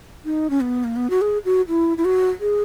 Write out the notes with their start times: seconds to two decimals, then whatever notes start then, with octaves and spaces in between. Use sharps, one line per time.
0.25 D#4
0.50 C#4
0.61 B3
0.84 A#3
0.96 B3
1.10 F#4
1.21 G#4
1.45 F#4
1.68 E4
1.98 E4
2.05 F#4
2.41 G#4